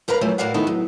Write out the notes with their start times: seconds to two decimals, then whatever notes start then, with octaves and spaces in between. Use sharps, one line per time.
0.08 G#2 A#4 B4 F5 A#5
0.21 C#3 F3 F#3 A3 E4 G4
0.38 A2 F#4 A#4 D5 F5 F#5
0.54 D#3 A3 B3 D#4 E4
0.67 F#3